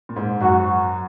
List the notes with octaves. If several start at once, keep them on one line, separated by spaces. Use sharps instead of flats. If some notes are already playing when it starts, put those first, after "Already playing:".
A#2
G#2
F#2 F#4